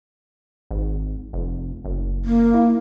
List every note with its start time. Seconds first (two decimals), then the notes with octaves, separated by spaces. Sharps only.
0.71 G#1
1.33 F1
1.85 F#1
2.25 A#3
2.54 E4